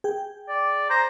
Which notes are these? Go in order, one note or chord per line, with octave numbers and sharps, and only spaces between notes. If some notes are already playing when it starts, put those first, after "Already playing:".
G#4 G5
D5
C5 A#5